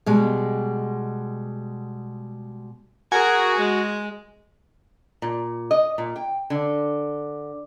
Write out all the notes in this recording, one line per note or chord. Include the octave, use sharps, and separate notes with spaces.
B2 G3 G#3
F#4 G#4 A#4 G#5
G#3
A#2
D#5
A#2
G5
D3